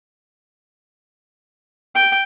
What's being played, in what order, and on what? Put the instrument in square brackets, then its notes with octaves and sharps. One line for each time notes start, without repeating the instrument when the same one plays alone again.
[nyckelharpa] G5